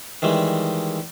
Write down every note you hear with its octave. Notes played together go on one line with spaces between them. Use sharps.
D#3 E3 G3 G#3